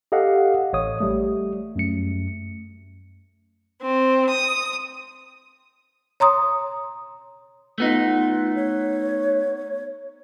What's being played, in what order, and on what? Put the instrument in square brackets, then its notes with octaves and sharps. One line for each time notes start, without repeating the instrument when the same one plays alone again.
[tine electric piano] G4 A4 D#5 F5 F#5
A1 C#5 D#6
G3 A3
F#2 A3 C#7
[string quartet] C4
D#6
[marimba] C#5 A#5 C6 D#6
[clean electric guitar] A3 B3 D#4 [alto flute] F4
[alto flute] C#5